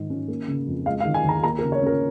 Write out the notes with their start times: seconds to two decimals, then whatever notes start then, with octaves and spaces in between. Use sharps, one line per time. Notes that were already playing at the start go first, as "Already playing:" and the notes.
Already playing: G#2 D#3 G#3
0.10 C#4
0.28 A#3
0.48 C#3
0.67 F2
0.86 G#3 F5
1.00 F5
1.05 D#3
1.14 G#5
1.24 D#2 A#5
1.43 A#3 A#5
1.59 A#4
1.63 C#3
1.72 C#5
1.82 C#4 A#4